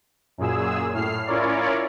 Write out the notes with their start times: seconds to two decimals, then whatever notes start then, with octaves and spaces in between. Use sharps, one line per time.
0.38 F#2 A#2 G#4 E6
0.94 A2 F6 C7
1.26 C#4 E4 F4 A#4 C#5 D5